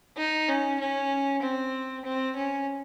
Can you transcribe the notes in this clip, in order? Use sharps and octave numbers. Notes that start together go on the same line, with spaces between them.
D#4
C#4
C#4
C4
C4
C#4